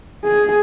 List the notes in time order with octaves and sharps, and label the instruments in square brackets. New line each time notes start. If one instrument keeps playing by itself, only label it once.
[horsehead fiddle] G#4